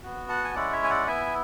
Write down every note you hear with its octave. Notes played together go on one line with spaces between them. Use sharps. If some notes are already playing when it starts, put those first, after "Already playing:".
B3 F#4
F#5 A5
G#5
G#3 C#4 E4 D5 F#5
C#5 E5
G#5
D5 F#5
B3 E4 E5 G#5